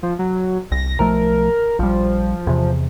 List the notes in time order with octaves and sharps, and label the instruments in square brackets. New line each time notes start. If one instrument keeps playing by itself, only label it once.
[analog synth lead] F3
F#3
[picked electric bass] C2 [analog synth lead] A#6
[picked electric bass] B1 F3 A3 [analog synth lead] A#4
[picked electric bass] A#1 G3 [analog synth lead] F3
[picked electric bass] E2 C3